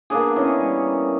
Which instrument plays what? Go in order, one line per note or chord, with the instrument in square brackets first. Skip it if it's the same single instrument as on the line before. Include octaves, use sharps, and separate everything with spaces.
[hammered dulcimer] A#3 B3 D4 G#4
E3 C#4 D#5
G3